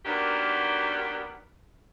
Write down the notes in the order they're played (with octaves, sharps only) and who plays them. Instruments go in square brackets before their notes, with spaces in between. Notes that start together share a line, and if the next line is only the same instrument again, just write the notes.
[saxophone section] D#3 F#3 A#3 B3 D4 G4